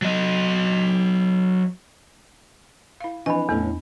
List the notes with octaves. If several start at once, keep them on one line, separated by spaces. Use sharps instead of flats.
F#3 D#5
E4 F5
E3 F3 C4 D4 D#5 B5
E2 A2 B3 C#4 A4